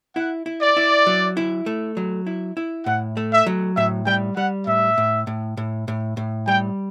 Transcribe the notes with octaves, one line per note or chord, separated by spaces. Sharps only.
E4 F#5
E4
D5
E4
F#3
E4
A3
F#3
E4
E4
A2 F#5
A3
E5
F#3
A2 E5
G3 G5
G3 F#5
A2 E5
A2
A2
A2
A2
A2
G3 G5